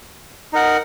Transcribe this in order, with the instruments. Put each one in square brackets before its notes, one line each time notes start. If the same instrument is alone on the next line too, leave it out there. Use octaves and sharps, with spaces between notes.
[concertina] D#4 A#4 F#5